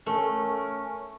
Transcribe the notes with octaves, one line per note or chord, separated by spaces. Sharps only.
A3 C#4 A#4